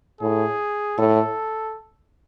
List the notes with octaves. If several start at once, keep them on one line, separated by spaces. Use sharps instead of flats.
A2 G#4
A2 A4